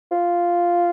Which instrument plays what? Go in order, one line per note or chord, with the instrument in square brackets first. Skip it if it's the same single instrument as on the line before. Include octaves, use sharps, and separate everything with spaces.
[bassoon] F4